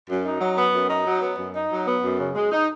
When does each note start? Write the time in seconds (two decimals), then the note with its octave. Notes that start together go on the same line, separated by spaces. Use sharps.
0.09 F#2
0.25 D#4
0.41 F#3
0.56 B3
0.74 F#2
0.90 D#4
1.06 F#3
1.22 B3
1.38 F#2
1.55 D#4
1.71 F#3
1.87 B3
2.03 F#2
2.19 C#3
2.35 G#3
2.51 D#4